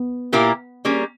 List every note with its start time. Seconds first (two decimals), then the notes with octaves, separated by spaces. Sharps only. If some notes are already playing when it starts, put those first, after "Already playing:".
Already playing: B3
0.32 A#2 A#3 E4 G4 A#4
0.85 G3 A#3 C#4 G#4